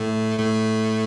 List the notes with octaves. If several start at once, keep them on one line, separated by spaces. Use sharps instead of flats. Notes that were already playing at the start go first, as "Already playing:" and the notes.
Already playing: A2 A3
A2 A3